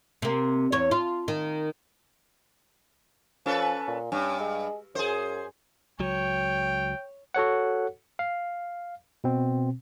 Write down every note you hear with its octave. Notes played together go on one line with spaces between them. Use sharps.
C3 A#3
E2 C#5
F4
D#3
F3 C#4 A4 B4
A#2
G2 C#4
G#3
F#2 G#4 C5
C#2 F#3 C#5 G5
F#4 A4 C#5 F#5
F5
B2 C4